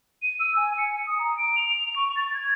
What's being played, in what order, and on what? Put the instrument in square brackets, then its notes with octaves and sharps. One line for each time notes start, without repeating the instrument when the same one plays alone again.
[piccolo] D#7
E6
G#5
C#7
D#6
A#5
D7
F7
C#6
A6
G#6